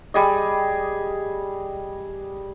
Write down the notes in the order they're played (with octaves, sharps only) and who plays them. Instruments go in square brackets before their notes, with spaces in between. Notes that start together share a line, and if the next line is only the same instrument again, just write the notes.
[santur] G3 G#4 D#5